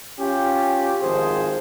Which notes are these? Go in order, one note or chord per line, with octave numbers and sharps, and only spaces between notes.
C#4 F4 G4
G#1 F3 G#4 C5